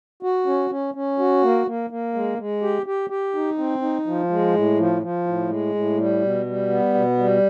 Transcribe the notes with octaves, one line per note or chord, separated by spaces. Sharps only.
F#4
C#4
C#4
C#4
F#4
A#3
A#3
A#3
G#3
G#3
G4
G4
G4
D#4
C4
D#4
F3
G#3
A2
F3
F3
A2
G#3
A2
G3
B2
G3
B3
B2
G3